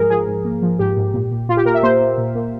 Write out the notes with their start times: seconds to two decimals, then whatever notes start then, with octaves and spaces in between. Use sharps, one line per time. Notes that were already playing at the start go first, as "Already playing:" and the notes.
Already playing: G#2 F3 G#4 A#4
0.10 F3 G#4
0.27 G#2
0.45 A#3
0.62 F3
0.79 G#2 G4
0.97 G#2
1.14 A#2
1.31 A#2
1.48 A#2 F4
1.57 G4
1.66 A#2 A#4
1.74 E5
1.83 A#3 C5
2.00 A#3
2.18 A#2
2.35 A#3